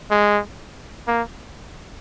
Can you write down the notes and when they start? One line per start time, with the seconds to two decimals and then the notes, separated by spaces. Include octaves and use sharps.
0.11 G#3
1.07 A#3